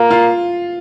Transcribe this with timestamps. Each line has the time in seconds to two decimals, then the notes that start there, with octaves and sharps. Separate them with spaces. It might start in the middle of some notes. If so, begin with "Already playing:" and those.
Already playing: A#3 F4
0.11 F4